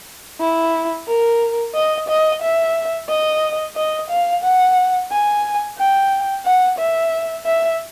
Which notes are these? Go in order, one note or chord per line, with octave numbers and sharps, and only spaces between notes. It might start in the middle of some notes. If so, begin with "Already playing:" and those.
E4
A#4
D#5
D#5
E5
D#5
D#5
F5
F#5
G#5
G5
F#5
E5
E5